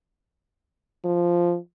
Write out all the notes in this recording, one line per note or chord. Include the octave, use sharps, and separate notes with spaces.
F3